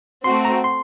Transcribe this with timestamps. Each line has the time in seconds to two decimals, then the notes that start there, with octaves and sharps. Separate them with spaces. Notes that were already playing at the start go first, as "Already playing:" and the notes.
0.24 A3 C4 F#4 C6
0.45 A#5
0.64 C6